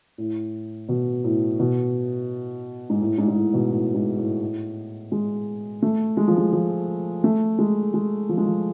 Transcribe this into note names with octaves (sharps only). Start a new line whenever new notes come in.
A2
B2
A2
B2
G#2
A2
G#2
G#2
A2
B2
A2
G#2
A2
G#3
A3
G#3
F3
G#3
F3
A3
G#3
G#3
F3
G#3
F3